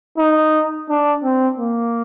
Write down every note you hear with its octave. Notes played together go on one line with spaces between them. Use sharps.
D#4
D4
C4
A#3